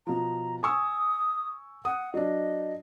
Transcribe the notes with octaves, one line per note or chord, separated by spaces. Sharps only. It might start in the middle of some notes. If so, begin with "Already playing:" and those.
B2 F3 A#5
G#5 C#6 D#6 E6
F#5 D#6
F#3 D4 D#5